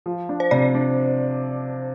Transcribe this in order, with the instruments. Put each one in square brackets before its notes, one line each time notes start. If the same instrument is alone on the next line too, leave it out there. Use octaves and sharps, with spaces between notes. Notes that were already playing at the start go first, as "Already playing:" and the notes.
[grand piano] F3
D4
[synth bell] C5
[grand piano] C3 [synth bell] D5
[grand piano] D4